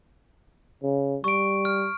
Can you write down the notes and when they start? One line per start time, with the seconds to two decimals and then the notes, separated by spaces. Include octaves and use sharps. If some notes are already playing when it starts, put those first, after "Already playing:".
0.83 C#3
1.24 G3 C#6 D7
1.65 F6